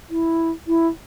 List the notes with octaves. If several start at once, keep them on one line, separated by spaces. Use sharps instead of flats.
E4
E4